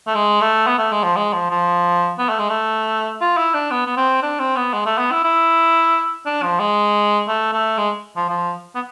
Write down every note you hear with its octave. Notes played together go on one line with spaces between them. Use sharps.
A3
G#3
A3
B3
A3
G#3
F3
G#3
F3
F3
B3
A3
G#3
A3
F4
E4
D4
B3
B3
C4
D4
C4
B3
G#3
A3
B3
E4
E4
D4
F3
G#3
A3
A3
G#3
F3
F3
B3